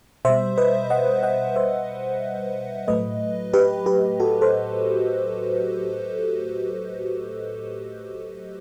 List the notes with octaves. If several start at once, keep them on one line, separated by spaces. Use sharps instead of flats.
B2 G3 C5 E5
B4 D#5
D#5 F#5
D#5 F#5
C5 E5
A2 F#3 A3 B4 D#5
G4 B4
G4 B4
F#4 A4
A4 C5